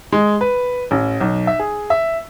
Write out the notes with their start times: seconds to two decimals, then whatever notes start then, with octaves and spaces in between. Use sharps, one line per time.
0.12 G#3
0.41 B4
0.91 A1
1.21 B1
1.47 E5
1.59 G#4
1.90 E5